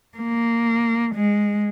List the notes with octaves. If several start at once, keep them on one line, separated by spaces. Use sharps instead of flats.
A#3
G#3